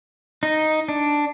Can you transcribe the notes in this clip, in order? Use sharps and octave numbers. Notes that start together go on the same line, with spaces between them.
D#4
D4